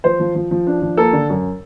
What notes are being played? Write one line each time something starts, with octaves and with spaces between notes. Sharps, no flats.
F3 C5
F3
F3
F3
D4
F3
A#3 A4
D3
F#2